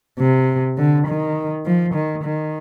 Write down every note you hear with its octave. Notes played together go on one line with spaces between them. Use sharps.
C3
D3
D#3
F3
D#3
D#3